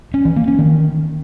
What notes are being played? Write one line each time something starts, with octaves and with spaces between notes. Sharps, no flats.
C#4
E3
A#3
C#4
D#3